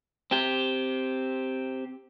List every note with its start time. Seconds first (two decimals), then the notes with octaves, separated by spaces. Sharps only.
0.31 C4 G4